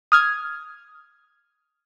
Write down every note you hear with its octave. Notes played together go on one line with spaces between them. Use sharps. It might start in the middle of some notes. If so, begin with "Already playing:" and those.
D#6 F6 G#6